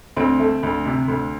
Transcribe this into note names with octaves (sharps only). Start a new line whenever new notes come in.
D2 C4
A3
D2
C3
D2